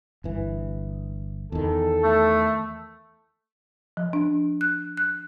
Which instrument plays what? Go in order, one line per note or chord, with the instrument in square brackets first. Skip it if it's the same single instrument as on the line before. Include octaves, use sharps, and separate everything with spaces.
[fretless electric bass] G1 E3
[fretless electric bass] E2 D#3 [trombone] A4
[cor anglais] A3
[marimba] F3
D4
F#6
F#6